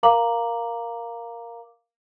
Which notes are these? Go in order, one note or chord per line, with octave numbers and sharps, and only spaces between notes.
A#4 F5 A#5 D6 F#7